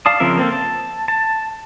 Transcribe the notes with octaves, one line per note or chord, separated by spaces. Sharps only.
D5 F5 A5 D#6
C#3 F3 C4 A#4 E5
A#3 C4 A4
A5
A5